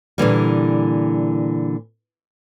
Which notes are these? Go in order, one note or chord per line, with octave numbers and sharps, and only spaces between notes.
A#2 D3 E3 G3